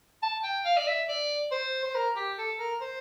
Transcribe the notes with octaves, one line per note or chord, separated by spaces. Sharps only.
A5
G5
F5
D5
E5
D5
C5
C5
A#4
G4
A4
A#4
C5